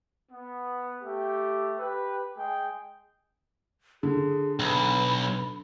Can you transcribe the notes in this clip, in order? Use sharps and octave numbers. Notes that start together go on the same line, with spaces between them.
B3
A3 G4
G4 B4
G#3 G#4 G5
D3 G#4
B1 B5